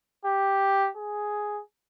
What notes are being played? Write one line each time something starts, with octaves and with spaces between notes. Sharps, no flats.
G4
G#4